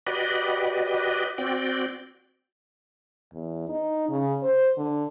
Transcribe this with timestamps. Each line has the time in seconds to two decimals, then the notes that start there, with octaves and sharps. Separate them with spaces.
0.07 F#4 G4 B4 D5 D#5
1.38 C4 F#4 D5 G5
3.32 E2
3.69 D#4
4.09 C#3
4.43 C5
4.77 D3